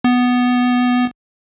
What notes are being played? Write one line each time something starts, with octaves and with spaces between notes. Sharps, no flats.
B3